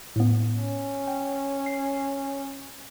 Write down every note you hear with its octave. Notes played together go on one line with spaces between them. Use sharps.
A2 B3
C#4
G5
C7